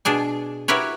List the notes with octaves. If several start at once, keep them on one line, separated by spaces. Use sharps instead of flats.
B2 D4 G#4 G#5
E4 F#4 G4 A#4 B4 C#5